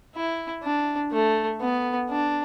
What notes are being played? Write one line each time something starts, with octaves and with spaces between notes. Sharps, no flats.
E4
D4
A3
B3
D4